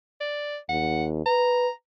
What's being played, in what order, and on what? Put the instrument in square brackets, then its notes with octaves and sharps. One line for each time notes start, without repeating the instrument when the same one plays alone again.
[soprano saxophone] D5
[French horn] D#2 [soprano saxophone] F#5
[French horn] B4 [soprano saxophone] A#5